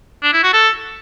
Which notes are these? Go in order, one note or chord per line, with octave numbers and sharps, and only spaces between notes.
D4
E4
F#4
A4